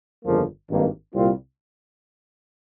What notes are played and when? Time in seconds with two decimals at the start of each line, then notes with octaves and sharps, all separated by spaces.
0.25 G1 F2 C#3 F3 A#3
0.69 G#1 G2 D#3 A#3
1.13 C2 A#2 G3 C4 F4